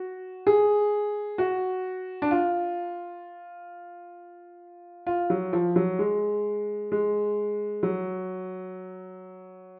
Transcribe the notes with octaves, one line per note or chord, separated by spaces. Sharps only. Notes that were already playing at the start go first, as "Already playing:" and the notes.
Already playing: F#4
G#4
F#4
D4
F4
F4
F#3
F3
F#3
G#3
G#3
F#3